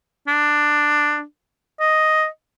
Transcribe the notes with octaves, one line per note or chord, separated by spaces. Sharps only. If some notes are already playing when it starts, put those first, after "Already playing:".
D4
D#5